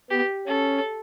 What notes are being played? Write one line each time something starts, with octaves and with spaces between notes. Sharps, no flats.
B3 G4
C#4 A4